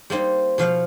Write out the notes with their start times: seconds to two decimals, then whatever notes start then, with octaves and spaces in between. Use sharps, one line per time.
0.10 G3 A#3 C4 D#4
0.58 B2 F3 F5 F#5